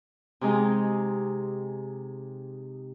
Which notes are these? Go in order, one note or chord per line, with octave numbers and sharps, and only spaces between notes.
C3 G#3 D#4 G#4